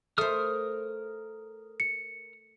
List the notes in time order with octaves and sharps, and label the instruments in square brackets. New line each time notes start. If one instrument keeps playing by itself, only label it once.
[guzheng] A3 C5 [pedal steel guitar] A#4 D#6 F6
[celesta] C#7